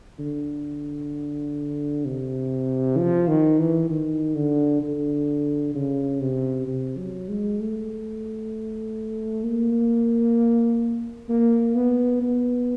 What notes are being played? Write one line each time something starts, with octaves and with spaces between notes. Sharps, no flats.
D3
C3
F3
D#3
E3
D#3
D3
D3
C#3
C3
C3
F#3
G#3
A3
A#3
A#3
B3
B3